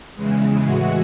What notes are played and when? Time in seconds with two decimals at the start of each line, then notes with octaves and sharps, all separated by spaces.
0.16 E2 C#3 E3 G#3
0.65 A2 E3 G#3 F#4